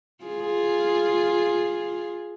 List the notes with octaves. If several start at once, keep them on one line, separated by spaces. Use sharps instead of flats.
F4 G#4